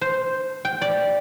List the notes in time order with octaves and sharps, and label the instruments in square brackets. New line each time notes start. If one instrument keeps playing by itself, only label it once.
[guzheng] C5
G5
D5